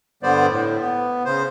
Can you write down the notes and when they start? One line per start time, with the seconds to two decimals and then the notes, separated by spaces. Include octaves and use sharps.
0.23 G2 D3 G3 B3 C5 D5
0.49 A2
0.80 B3
1.25 C#3 C5